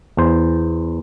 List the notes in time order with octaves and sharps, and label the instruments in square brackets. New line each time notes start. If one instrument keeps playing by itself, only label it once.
[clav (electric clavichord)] E2 C5